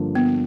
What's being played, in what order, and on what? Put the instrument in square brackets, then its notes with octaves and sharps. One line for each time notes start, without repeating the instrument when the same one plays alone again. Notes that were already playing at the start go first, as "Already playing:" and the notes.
Already playing: [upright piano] G2 D3 F3 A#3
[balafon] B3